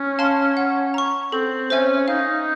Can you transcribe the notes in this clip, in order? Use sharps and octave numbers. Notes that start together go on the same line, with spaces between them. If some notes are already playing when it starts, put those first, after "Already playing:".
Already playing: C#4
F5 A5 C6 F6
F#5
A#5 C#6
C4 A4
C#4 C5 E5 G#5
D#4 F5